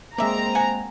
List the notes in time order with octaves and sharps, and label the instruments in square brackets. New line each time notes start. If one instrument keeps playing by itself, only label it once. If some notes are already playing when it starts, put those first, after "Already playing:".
[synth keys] G#3 A#3 [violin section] C4 A#5 [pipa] D5 E5
[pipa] F#5 G#5